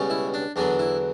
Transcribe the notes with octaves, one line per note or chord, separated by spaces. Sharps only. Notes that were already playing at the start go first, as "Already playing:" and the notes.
Already playing: C#2 B2 G3 C#4
E4
D4
E2 D3 F#3 B3 D4
E4